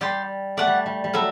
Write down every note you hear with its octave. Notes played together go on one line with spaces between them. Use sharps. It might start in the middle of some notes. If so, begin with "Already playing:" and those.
G3 G4 D5 G5 C6
A3 D5 F#5 A5
G3
G3
G3
F#3 A4 E5 B5